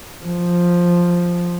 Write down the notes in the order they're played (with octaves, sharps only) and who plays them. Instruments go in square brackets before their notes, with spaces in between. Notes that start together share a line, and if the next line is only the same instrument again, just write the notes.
[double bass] F3